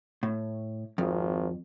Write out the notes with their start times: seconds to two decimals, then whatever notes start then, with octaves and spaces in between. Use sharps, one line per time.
0.23 A2
0.98 G#1 F2